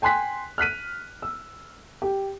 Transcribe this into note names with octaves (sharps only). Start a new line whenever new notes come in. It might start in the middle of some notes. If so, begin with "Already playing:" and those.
G5 G#5 C6 F#6 B6
F6 F#6 B6 D#7
E6
G4